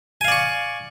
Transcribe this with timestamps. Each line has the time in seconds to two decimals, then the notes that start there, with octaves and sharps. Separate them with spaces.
0.21 G#5
0.25 F5
0.28 D5
0.32 C#6